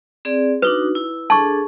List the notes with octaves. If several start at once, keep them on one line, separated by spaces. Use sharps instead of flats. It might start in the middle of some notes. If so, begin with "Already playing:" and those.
C4 G#4 D5
D4 D#4 F#4 B4
E4
D4 G#4 A4 A5 C#6